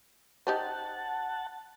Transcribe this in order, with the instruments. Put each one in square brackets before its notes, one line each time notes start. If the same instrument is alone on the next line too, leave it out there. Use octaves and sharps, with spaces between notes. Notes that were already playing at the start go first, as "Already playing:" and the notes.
[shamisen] D#4 G4 C5 [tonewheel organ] F#5 A5